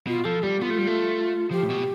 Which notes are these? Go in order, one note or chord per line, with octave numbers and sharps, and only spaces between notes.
B2 F4
F3 A4
G3 G4
B3 F4
A3
G3
A3
F3 G4
A2
B2